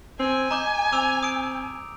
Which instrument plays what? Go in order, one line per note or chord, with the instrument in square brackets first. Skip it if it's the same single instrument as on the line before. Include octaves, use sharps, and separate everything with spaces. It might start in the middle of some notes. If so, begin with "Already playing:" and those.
[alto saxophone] C4 [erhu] G#5
[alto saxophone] D#5 [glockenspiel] A#5 D6 G6
[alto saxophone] C4 [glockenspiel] D6 E6 F7
[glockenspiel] D#6 D7